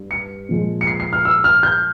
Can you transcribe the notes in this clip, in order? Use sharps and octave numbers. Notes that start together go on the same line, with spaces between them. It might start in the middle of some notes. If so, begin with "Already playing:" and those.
Already playing: G2
C#7
A#2 F3 G#3
C#7
C7
C7
F6
E6
F6
G6